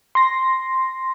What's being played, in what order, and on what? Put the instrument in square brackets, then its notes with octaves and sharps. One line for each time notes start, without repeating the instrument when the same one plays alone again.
[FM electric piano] C6 A#6